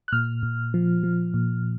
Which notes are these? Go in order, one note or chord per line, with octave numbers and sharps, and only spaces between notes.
F#6
A#2 F6
A#2
F3
F3
A#2